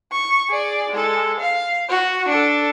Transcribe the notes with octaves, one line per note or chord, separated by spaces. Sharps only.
C#6
G#4 D5
G#3 A4
F5
F#4
D4 A4